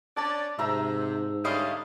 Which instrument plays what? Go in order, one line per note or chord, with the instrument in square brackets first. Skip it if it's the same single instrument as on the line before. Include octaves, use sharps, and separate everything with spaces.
[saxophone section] C#4 D4 D5 [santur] A5
[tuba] G#2 [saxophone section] C3 [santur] E5 A#5 E6
[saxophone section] D3 G3 C#4 [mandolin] E4 D#5 F5